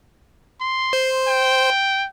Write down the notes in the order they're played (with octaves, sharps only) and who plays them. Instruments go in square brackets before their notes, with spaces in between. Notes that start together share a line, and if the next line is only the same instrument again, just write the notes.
[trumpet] C6
[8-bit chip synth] C5
[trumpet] G5